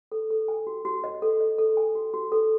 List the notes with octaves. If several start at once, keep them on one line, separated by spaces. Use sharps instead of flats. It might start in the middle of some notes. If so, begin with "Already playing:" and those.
A4
A4
G#5
F#4
F#4
D#5
A4
D#5
A4
G#5
F#4
F#4
A4